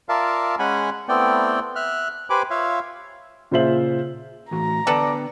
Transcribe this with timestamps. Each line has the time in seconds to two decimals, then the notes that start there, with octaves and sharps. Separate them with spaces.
0.09 F4 A#4 D5 E5 F5 A5
0.59 G#3 C#4 F#5 G#5 B5
1.08 A3 B3 C4 E4 D5 G5
1.76 E5 F6 F#6
2.30 G4 B4 C5 G#5 B5 D6
2.50 F4 C#5 E5 F5
3.51 A#2 C#3 F4 C5 E5 F#7
4.51 A2 E3 F#4 A#5
4.87 D3 B3 A4 B4 D5 G5